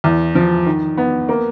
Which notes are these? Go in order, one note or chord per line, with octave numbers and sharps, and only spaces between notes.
E2
F3
D#3
B3
A#3